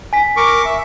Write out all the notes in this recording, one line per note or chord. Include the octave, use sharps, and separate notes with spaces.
G#5 B6
A#4 C#6 D6
E5